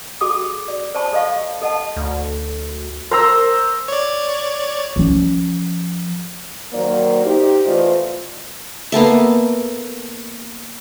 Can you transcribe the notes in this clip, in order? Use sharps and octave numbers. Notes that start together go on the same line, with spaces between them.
F#4 G#4 A4 G5 D6 D#6
D5
C5 D5 G#5 A5 B5 C#6
A4 D#5 F5 C#6
A4 D#5 F#5 A5
D2
A#4 C5 A#5 E6
C#5 D5
F3 C#4
D#3 F#3 A#3 C5 D5
D#4 G4 C5
E3 A3 F4 C5 D5 D#5
A#3 B3 A4 E5